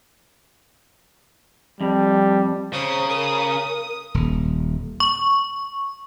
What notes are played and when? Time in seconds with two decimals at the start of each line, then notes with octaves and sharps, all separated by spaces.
1.81 F2 G3
2.73 C#3 C5 A#5 D#6
3.09 A#4
4.14 D#1
5.00 C#6